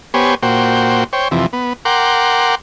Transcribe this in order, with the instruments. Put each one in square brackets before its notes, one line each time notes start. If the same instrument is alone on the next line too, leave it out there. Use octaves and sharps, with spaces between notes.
[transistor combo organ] B3 G4 C5 C#5 G#5
A#2 F#4 C5 G5
C5 C#5 G5
F2 C3 E3
B3
A#4 F#5 G5 C6 D6